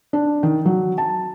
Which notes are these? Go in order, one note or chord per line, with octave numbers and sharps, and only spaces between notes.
D4
D#3
F#3
A5